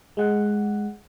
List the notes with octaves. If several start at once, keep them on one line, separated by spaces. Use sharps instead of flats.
G#3 F#5